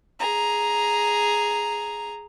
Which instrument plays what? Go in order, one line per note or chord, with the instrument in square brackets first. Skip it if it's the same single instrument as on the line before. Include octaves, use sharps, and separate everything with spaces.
[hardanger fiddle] G#4 A#5